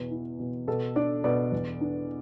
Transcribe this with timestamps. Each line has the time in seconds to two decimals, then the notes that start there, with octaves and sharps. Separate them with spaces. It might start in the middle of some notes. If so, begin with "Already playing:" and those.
Already playing: E2 B2
0.11 E4
0.39 B2
0.67 B2 A4
0.96 D4 D5
1.24 B2 D5
1.52 E2
1.81 D4